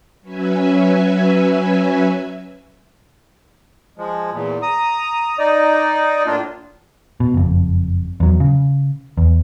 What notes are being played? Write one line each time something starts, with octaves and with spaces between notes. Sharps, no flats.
F#3 C#4 B4 E5 G#5
F3 G#3
E2 A#2
A#5 D#6
D#4 D5 D#5
A2 A#3 D4 F4
B2
F#1 F2
E2 F#3
C#3
E2